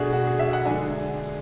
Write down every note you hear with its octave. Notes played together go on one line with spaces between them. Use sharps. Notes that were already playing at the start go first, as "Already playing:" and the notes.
Already playing: B2 A3 D4 F#4 G#4
F#4
G#4
E5
F#5
D3 G#3 D4 G#5